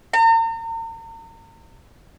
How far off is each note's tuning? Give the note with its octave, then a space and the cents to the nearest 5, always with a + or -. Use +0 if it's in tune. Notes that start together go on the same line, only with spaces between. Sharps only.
A#5 -40